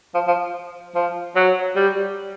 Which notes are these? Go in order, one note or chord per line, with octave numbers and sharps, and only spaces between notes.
F3
F3
F3
F#3
G3